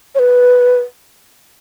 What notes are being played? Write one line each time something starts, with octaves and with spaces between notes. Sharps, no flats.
C#5
B4